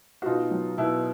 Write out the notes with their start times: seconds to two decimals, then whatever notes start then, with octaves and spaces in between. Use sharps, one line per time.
0.22 F#4
0.26 B2 D#4 F4
0.51 F#3
0.78 B2 E4